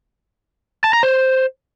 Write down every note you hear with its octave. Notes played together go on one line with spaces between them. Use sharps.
A5
A#5
C5